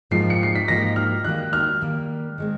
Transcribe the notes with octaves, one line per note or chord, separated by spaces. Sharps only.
G#2 F3 A#3 D#4 G4 C7
C#7
C7
B6
G#2 F3 A#3 D#4 G4 A#6
F6
D#3 G3 A#3 F#6
F6
D#3 G3 A#3
D#3 G#3 C4